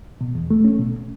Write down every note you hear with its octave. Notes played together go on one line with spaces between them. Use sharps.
B2
E2
A3
C#4
B2